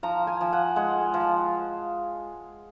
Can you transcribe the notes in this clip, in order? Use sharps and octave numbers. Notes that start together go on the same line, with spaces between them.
F3 A#5
G#5
F3
F#5
G#3 F#5
F3